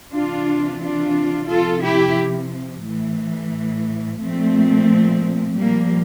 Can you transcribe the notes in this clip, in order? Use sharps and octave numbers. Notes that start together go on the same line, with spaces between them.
C3 E3 D4 F4
D4 F4
C3 F3 F4 A4
E4 G4
A2 E3
A#2 F3 A3 C4
A#2 F3 G3 A#3